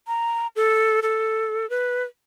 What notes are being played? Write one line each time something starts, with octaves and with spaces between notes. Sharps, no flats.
A#5
A4
A4
B4